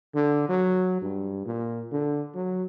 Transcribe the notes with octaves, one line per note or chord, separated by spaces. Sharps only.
D3
F#3
G2
A#2
D3
F#3